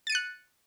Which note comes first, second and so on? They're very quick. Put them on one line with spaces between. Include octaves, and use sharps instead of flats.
A6 D#7 C#7 F#6